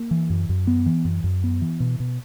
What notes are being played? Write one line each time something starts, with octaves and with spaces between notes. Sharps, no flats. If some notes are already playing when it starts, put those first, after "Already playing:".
Already playing: A#3
E3
F#2
F#2
B3
E3
F#2
F#2
B3
E3
B2
B2